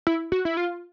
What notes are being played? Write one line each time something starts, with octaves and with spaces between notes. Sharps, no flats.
E4
F#4
E4
F4